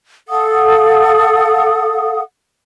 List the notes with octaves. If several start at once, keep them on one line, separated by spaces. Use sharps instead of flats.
A4 F5 F#5 D#6